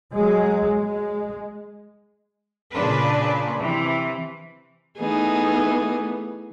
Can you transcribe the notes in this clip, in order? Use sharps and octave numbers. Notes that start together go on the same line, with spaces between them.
F#3 G#3
G#3
A#2 C#3 D4 B4
C3 E3
E3 A3 B3 D#4 G#4